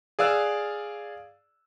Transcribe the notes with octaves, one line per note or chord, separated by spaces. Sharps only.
G#4 D5 F5 E6 F#6